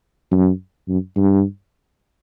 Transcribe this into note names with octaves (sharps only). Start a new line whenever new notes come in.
F#2
F#2
G2